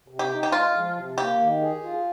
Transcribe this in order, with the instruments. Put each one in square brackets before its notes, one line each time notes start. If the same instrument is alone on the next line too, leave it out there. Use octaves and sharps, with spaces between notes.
[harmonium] C3
[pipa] G4
[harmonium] D#4
[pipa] G4
[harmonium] G#3 [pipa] F4
[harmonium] F3
C3
[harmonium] A#3 [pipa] G4
[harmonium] D#3
G#4
F4